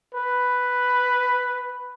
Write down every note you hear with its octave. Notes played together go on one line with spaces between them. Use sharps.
B4